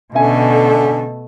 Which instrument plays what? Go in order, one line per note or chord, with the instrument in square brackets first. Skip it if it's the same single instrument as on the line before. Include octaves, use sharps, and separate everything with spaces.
[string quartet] B2 A3 [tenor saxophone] D3 [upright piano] C#4 E5 G#5